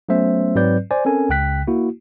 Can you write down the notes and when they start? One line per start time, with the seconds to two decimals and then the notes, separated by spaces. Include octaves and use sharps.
0.09 F#3 A3 B3 C#4 C5 E5
0.55 G#2 F#3 C4 B4 D5 G6
0.91 C5 D5 G#5
1.05 C4 C#4 A4 A#4 G#5
1.29 C#2 C#3 G5 F#6 B6
1.67 A#3 E4 F#4